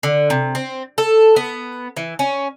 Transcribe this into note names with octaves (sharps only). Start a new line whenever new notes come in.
D3
C3
C4
A4
B3
E3
C#4